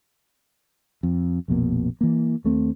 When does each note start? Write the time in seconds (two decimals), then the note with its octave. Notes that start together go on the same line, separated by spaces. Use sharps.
1.03 F2
1.48 A#1 F2 B2 A#3
2.01 E3 A#3
2.44 D#2 A3 C4